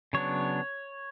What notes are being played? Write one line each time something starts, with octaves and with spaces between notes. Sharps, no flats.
C#3 F#3 B3 D4 C#5